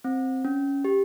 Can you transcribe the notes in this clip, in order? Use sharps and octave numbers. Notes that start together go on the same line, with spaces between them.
C4
C#4
G4